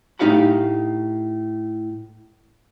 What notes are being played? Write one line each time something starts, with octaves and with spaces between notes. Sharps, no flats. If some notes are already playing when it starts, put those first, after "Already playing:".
A2 D#4 G4 F5 F#5 B5